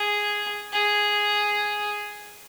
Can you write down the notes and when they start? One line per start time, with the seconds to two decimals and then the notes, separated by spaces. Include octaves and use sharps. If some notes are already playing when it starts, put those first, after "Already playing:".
Already playing: G#4
0.73 G#4